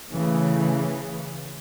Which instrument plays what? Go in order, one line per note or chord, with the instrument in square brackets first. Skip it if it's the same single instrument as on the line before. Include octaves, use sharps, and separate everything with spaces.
[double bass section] C#3 E3 A3